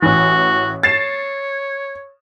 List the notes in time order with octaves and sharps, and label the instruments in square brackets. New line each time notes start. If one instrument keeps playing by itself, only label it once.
[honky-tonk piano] A1 E3 [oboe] F#4
[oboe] C#5 [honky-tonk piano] A6 C7 E7